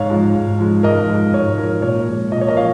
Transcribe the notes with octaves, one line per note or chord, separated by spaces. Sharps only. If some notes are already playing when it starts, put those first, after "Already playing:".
Already playing: G#2 C#5 F5
F3 G#3
G#2
F3 G#3
G#2 A#4 D#5
F3 G#3
G#2 C#5
F3 G#3 A#4
A#2 C#5
F3 G#3
A#2 D#5
C#5
A#4 D#5
F3 C#5 F5